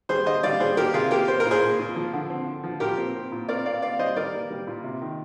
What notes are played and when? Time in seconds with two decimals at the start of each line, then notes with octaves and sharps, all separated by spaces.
0.09 G3 G#4 C5
0.26 D3 C5 D#5
0.43 G3 D5 F5
0.60 G3 G#4 C5
0.77 A#3 G4 A#4
0.94 C3 F4 G#4
1.11 A#3 G4 A#4
1.28 A#3 C5
1.40 A#4
1.45 A#2
1.51 G#4 C5
1.62 A#2
1.79 A#2
1.96 F3
2.13 D3
2.30 C4
2.47 D3
2.64 F3
2.80 A#2 G4 A#4
2.98 C4
3.15 C4
3.32 A#2
3.49 C4 A#4 D5
3.65 C4 D5 F5
3.82 C4 D5 F5
3.99 G3 C5 D#5
4.16 G3 A#4 D5
4.33 A#3
4.50 G3
4.67 A#2
4.84 C3
5.01 D#3